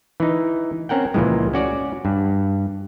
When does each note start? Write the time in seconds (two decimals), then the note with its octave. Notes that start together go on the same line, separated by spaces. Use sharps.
0.20 E3 D#4
0.89 C4 C#4 A#4 F#5 G5
1.14 C#2 A#2 E3 F3 G#3
1.54 C#4 F#4 D5
2.05 G2